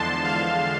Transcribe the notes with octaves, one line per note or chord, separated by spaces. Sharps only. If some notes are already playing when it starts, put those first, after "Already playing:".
Already playing: E2 D3 F3 G#3 A5 C6
F5 A5